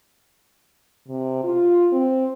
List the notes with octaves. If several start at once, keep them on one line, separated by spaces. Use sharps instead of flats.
C3
F4
C4